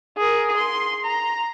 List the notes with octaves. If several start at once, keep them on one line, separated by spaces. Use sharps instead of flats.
G#4 A#4
C6
A#5